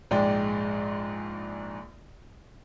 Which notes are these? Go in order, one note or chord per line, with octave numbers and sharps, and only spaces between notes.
A#1 G#2 G#3 D5 G5